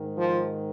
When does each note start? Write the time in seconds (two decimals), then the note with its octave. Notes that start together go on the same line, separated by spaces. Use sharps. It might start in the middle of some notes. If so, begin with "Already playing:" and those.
Already playing: G#2 D#3
0.18 F3